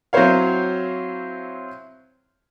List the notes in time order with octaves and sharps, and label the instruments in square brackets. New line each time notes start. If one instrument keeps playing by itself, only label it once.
[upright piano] F#3 C4 E4 C5 C#5 F5